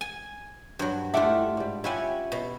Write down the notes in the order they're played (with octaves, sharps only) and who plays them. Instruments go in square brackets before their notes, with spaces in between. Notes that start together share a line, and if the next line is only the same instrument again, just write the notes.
[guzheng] G#5
[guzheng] G2 F#3 [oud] F#4
[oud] A3 E4 G4 [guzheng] D4 F4 [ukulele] E5 F#5
[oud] G#2 G3
[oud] C#4 F4 G4 [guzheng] E4 F#5 G#5 [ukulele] E5
[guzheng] B2